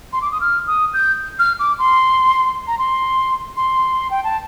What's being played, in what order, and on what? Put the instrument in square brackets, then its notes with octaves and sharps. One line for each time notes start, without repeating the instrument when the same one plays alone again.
[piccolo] C6
D6
D#6
F6
D#6
G6
F6
D6
C6
A#5
C6
C6
G5
A5